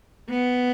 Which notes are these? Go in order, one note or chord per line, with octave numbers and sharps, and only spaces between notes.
B3